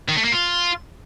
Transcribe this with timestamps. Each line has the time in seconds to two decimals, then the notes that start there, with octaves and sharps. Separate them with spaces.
0.09 D#3
0.17 A3
0.25 A#3
0.32 F4